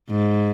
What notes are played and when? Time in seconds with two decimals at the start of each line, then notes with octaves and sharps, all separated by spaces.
0.10 G#2